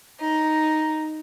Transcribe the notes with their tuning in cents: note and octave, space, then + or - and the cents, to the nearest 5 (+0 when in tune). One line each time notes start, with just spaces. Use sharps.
D#4 +0